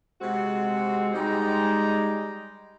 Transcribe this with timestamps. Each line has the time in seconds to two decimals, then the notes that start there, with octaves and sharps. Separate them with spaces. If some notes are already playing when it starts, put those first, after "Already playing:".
0.21 C3 G#3 C4 F#4
1.14 G3 G#3 D#4 G5 A#5